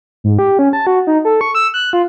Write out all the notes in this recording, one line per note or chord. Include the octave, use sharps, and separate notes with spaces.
G#2
G4
C#4
A5
F#4
D#4
A4
C#6
E6
F#6
F4